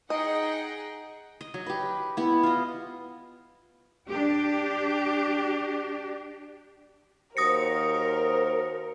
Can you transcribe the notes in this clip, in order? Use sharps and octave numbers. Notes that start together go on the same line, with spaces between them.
D#4 G#4 D#5 F#5 G5
D#5
F#3
G4 B4
B3 E4
F4 D#5
D4 G4
D#2 F#4 A#4 C5 D#6 A#6 C#7